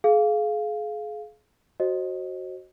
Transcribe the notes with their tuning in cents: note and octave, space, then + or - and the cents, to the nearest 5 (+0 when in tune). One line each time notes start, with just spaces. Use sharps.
G#4 +35 F5 +0
F#4 +5 C5 +30 D#5 +0